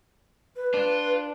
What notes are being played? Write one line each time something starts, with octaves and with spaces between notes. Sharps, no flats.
B4
D4 F4